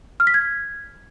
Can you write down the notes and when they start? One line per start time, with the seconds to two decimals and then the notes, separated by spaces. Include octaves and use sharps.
0.20 F6
0.27 B6
0.34 G#6